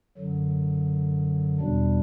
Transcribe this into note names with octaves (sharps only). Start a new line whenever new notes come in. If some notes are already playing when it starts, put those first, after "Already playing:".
F#2 D3 F#3
E2 B2 G3 D4